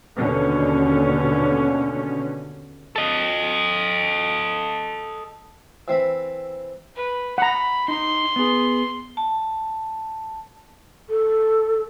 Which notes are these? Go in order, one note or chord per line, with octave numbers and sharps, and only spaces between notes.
D#2 B2 D3 C#4
A4 D#5
E3 C4 E5 B5
B4
F#5 A#5 B5
D#4 C6
B3 G#4
A5
A4